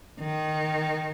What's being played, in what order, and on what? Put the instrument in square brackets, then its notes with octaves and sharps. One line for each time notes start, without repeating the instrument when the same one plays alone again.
[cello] D#3